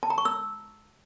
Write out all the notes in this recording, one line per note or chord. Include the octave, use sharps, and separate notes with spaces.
A5
A#5
C#6
E6